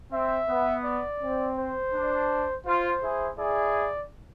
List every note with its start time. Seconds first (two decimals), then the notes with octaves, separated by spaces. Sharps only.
0.12 C4 E5
0.50 B3
0.85 D5
1.21 C4
1.58 C5
1.94 D4
2.66 F4 C5
3.02 E4 G#4
3.38 E4 G#4 D5